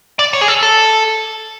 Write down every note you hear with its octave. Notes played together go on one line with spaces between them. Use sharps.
D5
C#5
G#4
A4
A4